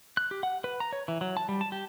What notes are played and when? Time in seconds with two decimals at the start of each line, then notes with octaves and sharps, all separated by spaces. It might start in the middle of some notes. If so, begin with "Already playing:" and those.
0.17 F#6
0.31 G4
0.43 F#5
0.64 B4
0.80 A#5
0.93 C#5
1.08 E3
1.21 F#3
1.37 A5
1.49 G3
1.61 A5
1.72 G4